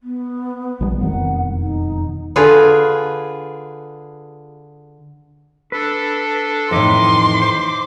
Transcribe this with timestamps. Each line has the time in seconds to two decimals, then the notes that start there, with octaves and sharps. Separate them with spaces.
0.03 B3
0.80 A#1 D#3 G3
1.01 E1 F2 D#3 F#5
1.60 D#4
2.36 D3 F4 G#4 B4
5.72 D4 A4 B4
6.71 F2 A2 D#3 E3 D#4 E4 C6 D6
7.42 C5